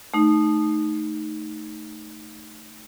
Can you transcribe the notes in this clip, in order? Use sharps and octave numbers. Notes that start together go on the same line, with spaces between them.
A3 D#4